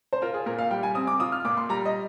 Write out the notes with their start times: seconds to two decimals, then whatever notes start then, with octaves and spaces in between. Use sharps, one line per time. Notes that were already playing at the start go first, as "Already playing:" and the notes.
0.13 C5
0.22 F4 A#4
0.34 G#4
0.46 A#2 A#4
0.59 F5
0.71 G3 G5
0.83 G#5
0.95 C4 D#6
1.07 D6
1.20 F4 D#6
1.32 F6
1.45 A#2 D6
1.57 C6
1.69 G3 A#5
1.85 D#5